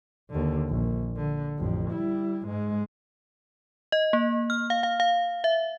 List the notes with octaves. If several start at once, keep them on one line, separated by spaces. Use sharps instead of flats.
D#2 D3
A#1
D3
A1 F2
G3 E4
G#2 G#3
D#5
A#3
F6
F5
F5
F5
E5